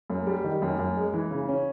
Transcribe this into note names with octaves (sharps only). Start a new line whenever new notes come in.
F#2
G3
D#3
F#2
F#2
G#3
E3
C#3
C#4